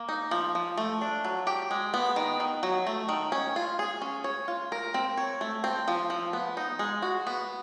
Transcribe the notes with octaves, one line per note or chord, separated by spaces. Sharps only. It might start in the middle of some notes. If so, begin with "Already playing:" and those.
Already playing: A#3
D#4
F3
F3
A3
D4
F#3
G4
G#3
B3
D#3
D#3
F#3
A3
D#3
C#4
F4
G#4
C#4
C#5
F4
A#4
C4
C#5
A3
C4
F3
F3
B3
D#4
G#3
F#4
B3